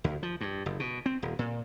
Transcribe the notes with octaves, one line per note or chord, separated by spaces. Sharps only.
D2
F3
G2
F#1
B2
C4
D#1
A#2